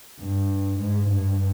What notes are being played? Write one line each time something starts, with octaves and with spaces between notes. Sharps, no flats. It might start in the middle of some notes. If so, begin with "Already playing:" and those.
G2
G#2
G2